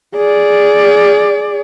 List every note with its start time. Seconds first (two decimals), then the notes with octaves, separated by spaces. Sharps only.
0.16 G#4 D5